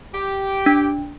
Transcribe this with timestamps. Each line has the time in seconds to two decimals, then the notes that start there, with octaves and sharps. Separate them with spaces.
0.15 G4
0.66 D4